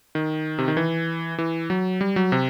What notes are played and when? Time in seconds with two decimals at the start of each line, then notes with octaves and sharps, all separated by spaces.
0.15 D#3
0.58 C3
0.68 D#3
0.77 E3
1.38 E3
1.70 F#3
2.01 G3
2.16 F#3
2.32 C3